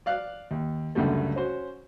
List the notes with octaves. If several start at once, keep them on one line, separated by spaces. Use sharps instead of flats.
D5 F5 F#6
D#2
C#2 F#2 D3 G3 A3
C#4 F#4 C5